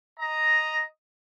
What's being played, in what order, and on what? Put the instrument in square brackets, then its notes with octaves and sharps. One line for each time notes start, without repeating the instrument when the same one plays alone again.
[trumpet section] D#5 A#5